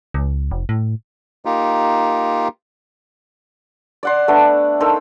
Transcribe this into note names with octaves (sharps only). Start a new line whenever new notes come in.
C#2
F1
A2
A#3 D#4 F4 G4
D5 F#5 C6
A3 B3 D4
D#4 A4 A#4 C5